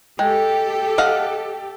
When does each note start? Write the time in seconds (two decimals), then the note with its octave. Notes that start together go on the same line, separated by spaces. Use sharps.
0.19 G#3 G4 A4 G5
0.98 D#5 F5 F#5